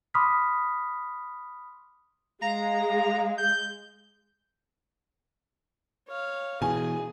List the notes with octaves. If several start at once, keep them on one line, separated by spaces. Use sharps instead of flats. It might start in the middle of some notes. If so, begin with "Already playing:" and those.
B5 C6 D6 D#6 F6 B6
G#3 F5 A#5
G6
C#5 F5
B2 E3 G#4 G#5